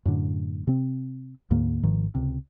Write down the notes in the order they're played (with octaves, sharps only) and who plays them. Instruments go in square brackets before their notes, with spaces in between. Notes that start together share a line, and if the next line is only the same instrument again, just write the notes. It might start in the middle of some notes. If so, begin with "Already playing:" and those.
[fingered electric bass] F#2 A2 D3
C3 C4
D2 G#2 D3 A#3
G#1 G#2 D#3 F3
C#2 C3